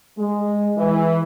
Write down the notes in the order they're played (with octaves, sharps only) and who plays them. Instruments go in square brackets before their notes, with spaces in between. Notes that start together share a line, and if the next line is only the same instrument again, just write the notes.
[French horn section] G#3
E3